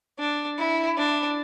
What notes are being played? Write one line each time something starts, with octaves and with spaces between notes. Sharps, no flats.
D4
E4
D4